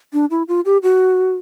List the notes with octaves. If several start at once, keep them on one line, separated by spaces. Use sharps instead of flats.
D4
E4
F4
G4
F#4